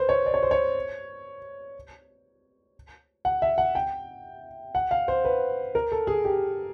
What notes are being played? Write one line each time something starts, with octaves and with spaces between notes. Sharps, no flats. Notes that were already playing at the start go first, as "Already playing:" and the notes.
Already playing: B4 C5
C#5
D5
C#5
C5
C#5
F#5
E5
F#5
G5
F#5
F5
C5
B4
A#4
A4
G#4
G4